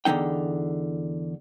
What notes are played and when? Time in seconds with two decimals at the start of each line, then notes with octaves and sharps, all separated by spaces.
0.05 E2 D3 F#3 D#4 G5